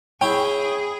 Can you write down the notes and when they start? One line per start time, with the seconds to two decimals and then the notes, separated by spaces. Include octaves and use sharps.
0.21 C#4 E4 G#4 G5